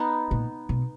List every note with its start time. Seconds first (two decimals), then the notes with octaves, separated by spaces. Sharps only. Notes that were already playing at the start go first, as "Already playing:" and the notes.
Already playing: B3 D#4
0.31 A#2
0.69 B2